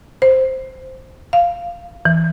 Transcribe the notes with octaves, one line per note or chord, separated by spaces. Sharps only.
C5
F5
E3